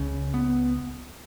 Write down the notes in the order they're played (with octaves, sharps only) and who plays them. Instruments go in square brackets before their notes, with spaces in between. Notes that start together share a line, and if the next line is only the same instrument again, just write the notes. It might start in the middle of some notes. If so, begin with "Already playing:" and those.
Already playing: [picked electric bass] C#2 C#3 C#4
B3